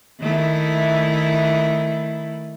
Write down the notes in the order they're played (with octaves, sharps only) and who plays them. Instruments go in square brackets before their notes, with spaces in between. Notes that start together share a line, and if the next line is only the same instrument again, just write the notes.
[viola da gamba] D#3 A3 E4